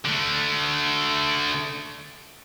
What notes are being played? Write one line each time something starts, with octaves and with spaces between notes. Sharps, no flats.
D3 A3